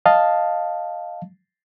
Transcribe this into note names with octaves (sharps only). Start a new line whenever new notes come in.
D#5 F5 A5